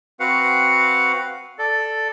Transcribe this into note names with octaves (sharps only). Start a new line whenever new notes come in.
C4 F#4 B4 F5 F#5
A4 D5